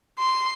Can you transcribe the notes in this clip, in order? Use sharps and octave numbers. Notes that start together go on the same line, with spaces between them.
C6